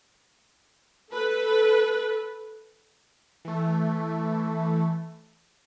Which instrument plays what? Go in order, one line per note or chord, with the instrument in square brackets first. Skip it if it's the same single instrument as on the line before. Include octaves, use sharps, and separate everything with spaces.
[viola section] A4 B4
[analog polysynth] E3 A3